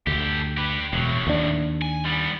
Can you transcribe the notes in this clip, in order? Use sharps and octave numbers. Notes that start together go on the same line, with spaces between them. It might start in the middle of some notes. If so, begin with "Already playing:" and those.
D2 G4 A4
G4 B4
E1 A2 F#3
D#2 D4
G#5
G3 B3